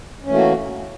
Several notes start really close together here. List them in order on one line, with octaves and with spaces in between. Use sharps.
C#4 E3 A3 A#3 F#4